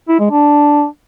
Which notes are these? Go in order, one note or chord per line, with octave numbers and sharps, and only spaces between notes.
E4
G#3
D4